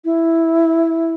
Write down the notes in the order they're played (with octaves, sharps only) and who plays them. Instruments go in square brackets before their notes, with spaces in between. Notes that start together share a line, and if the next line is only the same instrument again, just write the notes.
[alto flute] E4